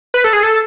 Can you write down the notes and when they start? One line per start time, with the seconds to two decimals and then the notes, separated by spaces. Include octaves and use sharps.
0.14 B4
0.24 A4
0.33 G#4
0.43 A4